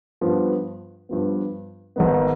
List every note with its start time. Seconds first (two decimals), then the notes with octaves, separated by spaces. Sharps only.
0.21 G2 F3 B3
1.09 G2 F3 B3
1.96 G#1 G#2 D#3 B3